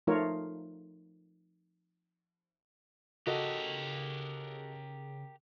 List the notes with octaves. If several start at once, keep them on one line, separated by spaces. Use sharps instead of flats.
F3 A3 D#4 F4 A#4 C#5
C#3 F#4 G4 A4 A#4 D#5